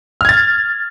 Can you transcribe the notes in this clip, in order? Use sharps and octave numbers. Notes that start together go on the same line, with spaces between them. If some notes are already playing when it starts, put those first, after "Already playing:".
F6 G#6 A6